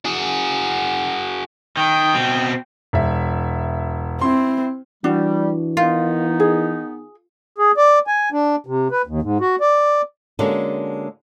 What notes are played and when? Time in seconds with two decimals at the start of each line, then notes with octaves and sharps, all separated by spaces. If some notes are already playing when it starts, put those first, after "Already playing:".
0.05 F#4 G#4
1.77 D#3 G5
2.14 B2 C4
2.93 E1 E5
4.21 C4 E4 C6
5.04 E3 G3 D4 F#4
5.77 D#3 B3 D#4 F4
6.40 G#4
7.58 G#4
7.77 D5
8.07 G#5
8.32 D4
8.66 C3
8.91 B4
9.07 D#2
9.22 G#2
9.41 F#4
9.61 D5
10.39 D3 G#3 A#3 C#4 F#4 A4